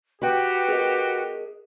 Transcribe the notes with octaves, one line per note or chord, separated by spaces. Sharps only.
F#4 G4 B4 G5
G#4 A#4 D#5